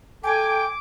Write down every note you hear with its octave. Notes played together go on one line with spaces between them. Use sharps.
A4 G5 G#5 D6